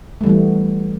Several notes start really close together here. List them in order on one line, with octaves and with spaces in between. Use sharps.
A3 G3 E3 B3